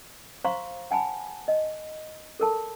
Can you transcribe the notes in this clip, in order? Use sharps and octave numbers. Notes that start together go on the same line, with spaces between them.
C5 F5 A#5 C6 C#6
F#5 G#5 A5 B5
D#5
A4 A#4 A5